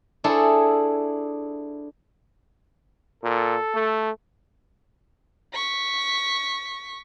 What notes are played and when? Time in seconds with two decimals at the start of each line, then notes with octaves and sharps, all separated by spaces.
0.24 D4 E4 G#4 A4 C5 C#5
3.24 A#2 A4
3.75 A3
5.54 C#6 B6